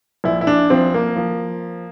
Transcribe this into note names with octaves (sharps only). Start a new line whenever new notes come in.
A#1 E4
E4
D4
F3 C4
A#3
F3